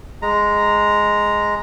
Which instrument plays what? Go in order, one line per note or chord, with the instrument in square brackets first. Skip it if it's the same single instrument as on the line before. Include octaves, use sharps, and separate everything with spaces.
[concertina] G#3 A#5